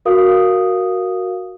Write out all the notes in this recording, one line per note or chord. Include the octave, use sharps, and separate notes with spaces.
F#4 A#4 F5 D#6